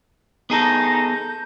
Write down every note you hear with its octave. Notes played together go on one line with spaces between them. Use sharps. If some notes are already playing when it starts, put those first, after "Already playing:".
B3 D#4 G#4 A4
G6